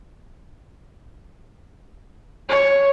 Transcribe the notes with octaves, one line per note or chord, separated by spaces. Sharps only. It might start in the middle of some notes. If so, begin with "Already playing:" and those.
C#5